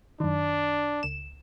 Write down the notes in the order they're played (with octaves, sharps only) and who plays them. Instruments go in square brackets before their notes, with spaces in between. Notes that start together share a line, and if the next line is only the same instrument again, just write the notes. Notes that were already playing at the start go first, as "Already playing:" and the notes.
[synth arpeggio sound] F#2 D#3 [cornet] D4
[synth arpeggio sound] C#2 E7